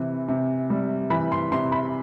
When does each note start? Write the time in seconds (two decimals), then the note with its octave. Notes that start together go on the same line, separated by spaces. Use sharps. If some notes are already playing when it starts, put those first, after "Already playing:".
Already playing: C3 E3
0.28 C3
0.70 G3
1.10 E3 B5
1.32 C6
1.52 C3 C6
1.72 B5